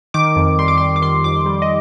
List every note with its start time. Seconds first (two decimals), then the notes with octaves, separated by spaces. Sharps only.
0.14 D#3 D6
0.36 F2
0.59 G3 C6
0.68 D6
0.78 G3 C6
0.96 D6
1.02 D#3 C6
1.24 F2 D6
1.46 G3
1.62 D#5